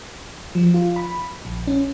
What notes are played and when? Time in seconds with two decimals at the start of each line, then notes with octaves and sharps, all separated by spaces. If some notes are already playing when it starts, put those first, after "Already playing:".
0.55 F3
0.74 F4
0.96 B5
1.45 A#1
1.67 C#4